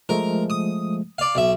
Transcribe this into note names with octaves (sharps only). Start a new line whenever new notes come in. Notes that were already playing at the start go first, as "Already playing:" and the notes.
F3 G#3 A3 A#4
D#6
D5 F5
B1 E5